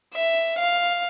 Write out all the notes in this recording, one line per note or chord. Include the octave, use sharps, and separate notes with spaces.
E5
F5